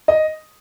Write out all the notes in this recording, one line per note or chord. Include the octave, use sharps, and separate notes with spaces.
D#5